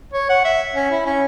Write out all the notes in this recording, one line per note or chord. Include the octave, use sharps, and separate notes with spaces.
C#5
F#5
E5
C#4
E4
C#4